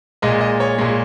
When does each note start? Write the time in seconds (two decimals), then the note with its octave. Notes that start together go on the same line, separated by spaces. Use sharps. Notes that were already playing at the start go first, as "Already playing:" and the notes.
0.22 A#2 G#3 D#5
0.41 D#5
0.60 C#5
0.78 A#2 G#3